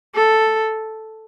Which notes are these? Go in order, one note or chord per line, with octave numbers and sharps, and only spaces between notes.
A4